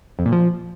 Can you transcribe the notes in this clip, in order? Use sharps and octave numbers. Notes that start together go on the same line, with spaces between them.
F2
A#2
F3